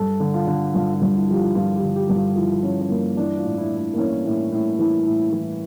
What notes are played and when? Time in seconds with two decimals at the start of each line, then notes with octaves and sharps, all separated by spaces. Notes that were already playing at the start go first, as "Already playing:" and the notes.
Already playing: G2 A4
0.20 D3
0.34 F4
0.47 D3
0.74 G2 F4
0.94 F4
1.02 G2
1.15 E4
1.29 F3 G4
1.35 F4
1.55 G2 F4
1.76 G4
1.82 D3
1.96 G4
2.09 G2
2.16 F4
2.36 F3 E4
2.63 F3 C#4
2.81 C#4
2.90 G2 A#3
3.17 E3 D4
3.37 F4
3.44 A2
3.58 E4
3.71 A2
3.77 D4
3.93 A#3
3.98 E3 C#4
4.25 A2
4.52 A2
4.79 E3
5.06 A2
5.32 E3